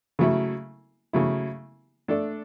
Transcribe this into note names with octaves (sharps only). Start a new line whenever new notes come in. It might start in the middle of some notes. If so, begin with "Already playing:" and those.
C#3 F#3 A3 E4
C#3 F#3 A3 E4
A3 D4 A4 D5